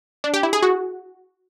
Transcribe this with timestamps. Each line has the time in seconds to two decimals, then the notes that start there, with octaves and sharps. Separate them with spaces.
0.24 D4
0.34 G4
0.43 E4
0.53 G#4
0.62 F#4